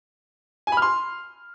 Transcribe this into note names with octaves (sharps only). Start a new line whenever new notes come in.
G#5
B5
F6
C6